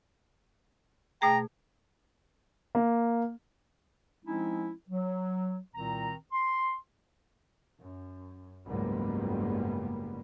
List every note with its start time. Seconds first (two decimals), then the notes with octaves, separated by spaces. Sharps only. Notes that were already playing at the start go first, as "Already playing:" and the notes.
1.22 B2 A3 G#4 G5 A#5
2.75 A#3
4.25 F3 G#3 C4 C#4 D#4 E4
4.89 F#3
5.74 C2 A#2 D#3 C4 A#5
6.32 C6
7.80 F#2
8.67 F#1 C#2 G#2 G3 A#3 B3